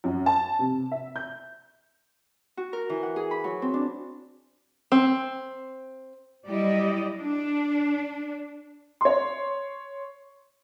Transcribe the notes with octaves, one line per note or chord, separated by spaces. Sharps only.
F#2
A5
C3
E5
G6
F#4
A#4
E3
F#5
G#4
B5
F#3
C4
D4
C4
F#3 G3 E4 G4 D5 D#5
D4
C#5 C6